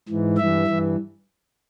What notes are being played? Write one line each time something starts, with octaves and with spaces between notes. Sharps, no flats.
G#2 E3
G2 E3 E5
G2 E3